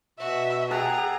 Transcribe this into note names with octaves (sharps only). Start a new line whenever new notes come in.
B2 F#4 E5
G#4 A4 F#5 G5 A#5